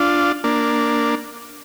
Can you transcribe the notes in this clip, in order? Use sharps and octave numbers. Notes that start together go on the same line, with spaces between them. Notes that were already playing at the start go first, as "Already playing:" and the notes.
Already playing: D4 F4
A#3 D4